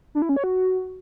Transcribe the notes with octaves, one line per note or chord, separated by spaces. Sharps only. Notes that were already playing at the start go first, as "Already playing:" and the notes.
D4
E4
C#4
C#5
F#4